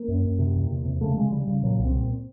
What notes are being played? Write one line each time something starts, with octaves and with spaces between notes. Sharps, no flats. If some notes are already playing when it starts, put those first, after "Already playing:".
Already playing: A#3
F#2
F#2
C3
E2
C3
C3
C#3 A3
C#3 G#3
C#3 G3
C#3
A#2 F#3
C2
C4
A#2